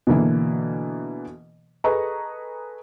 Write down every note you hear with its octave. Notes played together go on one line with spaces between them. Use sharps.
B2 D3 E3 A#3
G#4 A4 B4 D#5 A#5 C#6